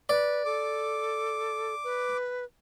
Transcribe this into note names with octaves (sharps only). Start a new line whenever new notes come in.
B4 D5
A4 D6
B4